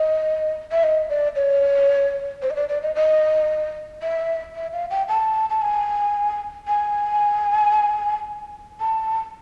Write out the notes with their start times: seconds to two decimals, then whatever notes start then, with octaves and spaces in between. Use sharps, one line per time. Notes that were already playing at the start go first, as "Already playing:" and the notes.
Already playing: D#5
0.72 E5
0.83 D#5
1.09 D5
1.36 C#5
2.43 C5
2.50 D#5
2.56 D5
2.69 D5
2.82 D#5
2.95 D#5
4.02 E5
4.55 E5
4.73 F5
4.91 G5
5.08 A5
5.50 A5
5.62 G#5
6.68 G#5
8.80 A5